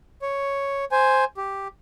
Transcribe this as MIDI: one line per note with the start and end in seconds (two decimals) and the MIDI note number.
0.22 0.85 73
0.92 1.24 72
0.92 1.24 80
1.37 1.68 67